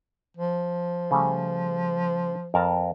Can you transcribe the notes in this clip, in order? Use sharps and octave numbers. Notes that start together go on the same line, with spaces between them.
F3
C#3 G3 A3
F2 A#4 A5